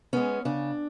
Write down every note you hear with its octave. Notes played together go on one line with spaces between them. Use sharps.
G#3 B3 C#4
C#3 D4